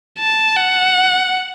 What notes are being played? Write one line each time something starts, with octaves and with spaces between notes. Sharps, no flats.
A5
F#5